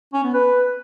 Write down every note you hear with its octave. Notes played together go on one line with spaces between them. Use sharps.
C#4
B3
B4